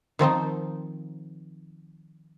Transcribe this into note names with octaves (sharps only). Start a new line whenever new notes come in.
D#3 F3 C4 D#4